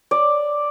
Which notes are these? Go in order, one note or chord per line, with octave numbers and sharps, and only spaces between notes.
D5